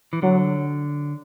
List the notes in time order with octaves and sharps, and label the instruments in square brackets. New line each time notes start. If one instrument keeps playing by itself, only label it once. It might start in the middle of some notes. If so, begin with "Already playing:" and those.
[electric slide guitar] E3
[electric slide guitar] D3 [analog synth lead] F#3